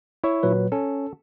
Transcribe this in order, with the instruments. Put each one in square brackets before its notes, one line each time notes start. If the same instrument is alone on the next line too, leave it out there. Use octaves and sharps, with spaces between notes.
[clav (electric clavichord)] E4 C#5 E5
[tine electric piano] A#2 F#3 B4
[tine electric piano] C#4 [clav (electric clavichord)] A4